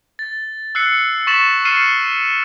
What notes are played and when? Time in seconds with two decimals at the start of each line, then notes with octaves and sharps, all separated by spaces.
0.19 A6
0.75 E6 F#6 C7 C#7
1.27 C#6 A6 B6 E7 F#7
1.65 C#6 F6 C7 C#7 D#7 E7